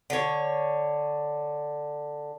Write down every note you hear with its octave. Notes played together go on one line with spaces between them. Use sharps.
D3 C#5